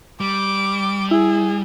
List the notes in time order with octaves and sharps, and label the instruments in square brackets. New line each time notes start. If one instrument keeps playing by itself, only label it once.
[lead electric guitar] G3 [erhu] D6
[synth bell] E4 [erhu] G#4